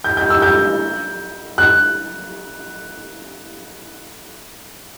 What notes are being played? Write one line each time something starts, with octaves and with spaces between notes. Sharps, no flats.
G6
G6
E6
G6
F#6